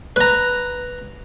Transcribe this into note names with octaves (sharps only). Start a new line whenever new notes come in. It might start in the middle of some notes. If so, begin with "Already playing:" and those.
B4 A#5